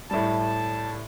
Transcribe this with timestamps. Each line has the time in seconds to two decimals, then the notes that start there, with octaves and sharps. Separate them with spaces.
0.11 A2 G3 A5